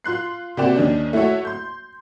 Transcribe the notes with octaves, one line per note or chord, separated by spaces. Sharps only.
F4 C6 F#6 C7
C3 A#3 F#4 D5 G5 E7
D#2 D#3 C#4 D4
A3 E4 F#4 C#5 E5
C6 G6